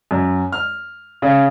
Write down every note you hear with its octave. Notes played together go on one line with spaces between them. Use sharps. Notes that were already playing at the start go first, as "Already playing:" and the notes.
F#2
F6
C#3